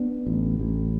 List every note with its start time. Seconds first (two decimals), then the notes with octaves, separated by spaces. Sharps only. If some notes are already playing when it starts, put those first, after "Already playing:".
Already playing: B3 D4
0.27 A1
0.59 A1